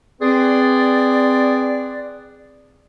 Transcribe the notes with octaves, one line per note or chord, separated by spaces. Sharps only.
C4 G#4 B4 D5